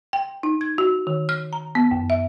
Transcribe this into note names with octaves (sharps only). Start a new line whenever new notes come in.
G5
D#4
G#6
F#4
D#3
F6
A#5
B3
F#2
E5